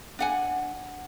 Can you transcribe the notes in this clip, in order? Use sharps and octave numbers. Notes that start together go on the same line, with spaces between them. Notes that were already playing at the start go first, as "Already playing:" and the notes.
D4 F#5 G#5